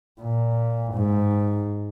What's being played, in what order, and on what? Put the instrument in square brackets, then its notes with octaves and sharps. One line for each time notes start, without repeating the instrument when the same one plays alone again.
[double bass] A#2
G#2